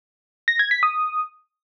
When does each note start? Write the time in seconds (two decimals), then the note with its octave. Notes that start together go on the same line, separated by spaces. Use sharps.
0.48 A#6
0.59 G#6
0.71 B6
0.83 D#6